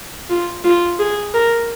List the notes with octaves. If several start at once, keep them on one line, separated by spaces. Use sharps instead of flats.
F4
F4
G#4
A#4